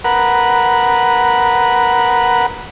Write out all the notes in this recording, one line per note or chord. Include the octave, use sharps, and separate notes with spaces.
A#4 B4 F#5